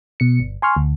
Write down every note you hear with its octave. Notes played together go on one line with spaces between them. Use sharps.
B2 C#7
G1
G#5 C6 C#6 F6
D2